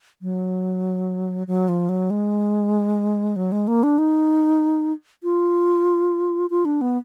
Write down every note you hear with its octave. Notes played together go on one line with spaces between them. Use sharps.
F#3
F#3
F3
F#3
G#3
F#3
G#3
A#3
D4
D#4
F4
F4
D4
B3